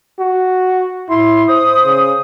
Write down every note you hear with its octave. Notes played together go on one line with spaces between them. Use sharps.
F#4
A2 E4 C6
C5 D#6
C#3